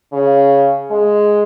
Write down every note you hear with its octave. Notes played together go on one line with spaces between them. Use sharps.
C#3
G#3